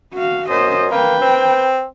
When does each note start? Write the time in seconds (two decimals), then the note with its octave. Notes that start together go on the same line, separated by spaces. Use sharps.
0.14 F#4 F5
0.49 F#2 C5 D#5
0.91 A#3 B4 G5
1.22 C4